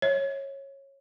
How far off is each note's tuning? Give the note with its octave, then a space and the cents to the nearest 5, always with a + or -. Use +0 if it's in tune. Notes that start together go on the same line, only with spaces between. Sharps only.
C#5 -15 E5 -40